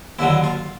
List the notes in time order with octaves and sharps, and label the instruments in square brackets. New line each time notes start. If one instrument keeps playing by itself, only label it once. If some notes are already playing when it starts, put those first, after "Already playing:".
[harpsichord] D#2 D3 F#3 E4
F4